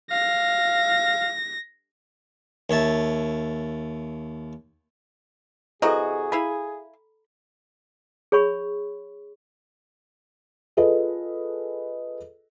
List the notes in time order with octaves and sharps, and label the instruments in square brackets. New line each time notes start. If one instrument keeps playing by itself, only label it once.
[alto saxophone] F5 [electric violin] A#6
[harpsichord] D#2 C#5 E5 A5
[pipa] C3 E3 F#4 [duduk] G#4 [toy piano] A4 A#5 [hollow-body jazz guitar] D#5
[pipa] E4 F5 G#5 [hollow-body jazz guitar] B5
[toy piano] G#4 C#5 B5 C#6
[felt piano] F4 G#4 A4 B4 D#5